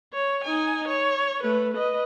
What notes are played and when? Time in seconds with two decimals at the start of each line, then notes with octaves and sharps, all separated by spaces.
0.13 C#5
0.44 D#4 G#5
0.88 C#5
1.43 A3 B4
1.73 B4 D#5